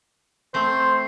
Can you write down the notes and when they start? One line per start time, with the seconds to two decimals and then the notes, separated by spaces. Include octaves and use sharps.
0.54 A3 C4 C5